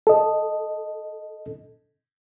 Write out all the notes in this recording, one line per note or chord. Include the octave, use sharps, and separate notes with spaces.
A4 D#5